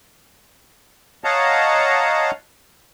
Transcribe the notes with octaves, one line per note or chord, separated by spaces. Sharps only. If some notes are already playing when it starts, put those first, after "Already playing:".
C#5 D#5 F5 F#5 A5 A#5